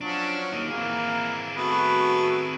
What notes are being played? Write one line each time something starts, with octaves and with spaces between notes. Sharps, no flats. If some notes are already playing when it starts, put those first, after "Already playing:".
F3 F#3 C#4 D4
A#3 D#4
E3 A#3 C4 G#4
A3 B3 F#4 B4